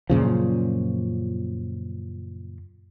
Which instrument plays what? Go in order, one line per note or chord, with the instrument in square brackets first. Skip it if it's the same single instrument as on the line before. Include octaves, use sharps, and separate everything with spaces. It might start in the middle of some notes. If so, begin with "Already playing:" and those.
[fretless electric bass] F#2 A#2 C#3 F3